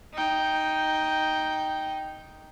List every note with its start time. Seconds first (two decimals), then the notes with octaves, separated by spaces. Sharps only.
0.14 D#4 G5